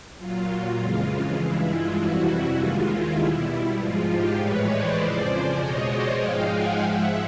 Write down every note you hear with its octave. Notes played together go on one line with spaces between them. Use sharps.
A#2 F#3 F4
F2 C#3 E3 G#3
F4
G2 E3 G#3 E4
F4
F2 C3 E3 G3 E4 F#4
D#2 D#3 G#3 F4
E4
B2 G3
G#2 F3 G#3 F4
F4 G4
A2 E3 G#3 B4 C#5
C5 D5
F2 C#3 F3 G#3
C5 D5
B2 G#3 C#5 D#5
C5 D5
G#2 F3 G#3 F5 G5
F#5 G#5
G#2 F3 G#3 E5 F#5